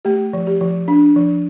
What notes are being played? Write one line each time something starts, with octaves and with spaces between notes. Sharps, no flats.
A3 G4
F3
G4
F3
D4
F3